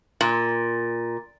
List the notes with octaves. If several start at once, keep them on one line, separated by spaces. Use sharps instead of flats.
A#2